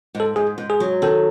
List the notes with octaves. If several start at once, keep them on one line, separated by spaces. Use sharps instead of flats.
G#2
A4
G#2 G#4
G#2
G#4
F#3
D#3 A4